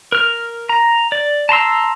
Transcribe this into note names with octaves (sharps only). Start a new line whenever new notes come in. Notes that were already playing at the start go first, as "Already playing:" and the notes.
A#4 F6
A#5
D5
A5 A#5 C6 E6